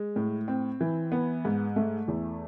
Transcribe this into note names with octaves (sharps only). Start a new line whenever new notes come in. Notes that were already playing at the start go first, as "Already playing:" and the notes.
Already playing: G#3
A2
C4
E3
B3
G#2
A3
E2